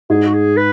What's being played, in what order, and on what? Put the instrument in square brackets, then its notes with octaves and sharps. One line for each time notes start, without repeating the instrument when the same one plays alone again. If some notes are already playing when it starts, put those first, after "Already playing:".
[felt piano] G#2 [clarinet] G#4
[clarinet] F#4
G#4
B4